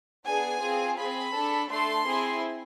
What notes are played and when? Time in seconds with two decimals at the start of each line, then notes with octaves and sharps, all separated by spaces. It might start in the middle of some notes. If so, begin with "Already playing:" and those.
0.23 B3 D4 G#4 G#5
0.60 C4 F4 G#4
0.96 C4 G#4 B5
1.33 D4 A4
1.68 A3 D4 A4 C6
2.05 C4 E4 G#4